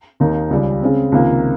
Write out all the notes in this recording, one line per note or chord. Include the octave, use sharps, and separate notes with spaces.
D#2 D#3 A#3 D#4
C#2 C#3 G3
C#3 G#3 C4
C#2 C3 D#3 A#3 F4